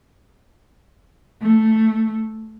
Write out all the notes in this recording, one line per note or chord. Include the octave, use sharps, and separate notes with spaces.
A3